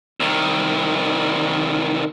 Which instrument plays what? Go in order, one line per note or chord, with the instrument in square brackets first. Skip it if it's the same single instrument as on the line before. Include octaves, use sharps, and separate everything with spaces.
[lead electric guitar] C2 D#3